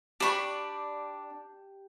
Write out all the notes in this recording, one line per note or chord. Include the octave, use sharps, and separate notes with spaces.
D4 G4 D5 B5 C#6